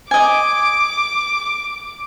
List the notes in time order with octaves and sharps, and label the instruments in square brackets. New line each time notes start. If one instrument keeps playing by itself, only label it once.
[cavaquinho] D#5 G#5 [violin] D6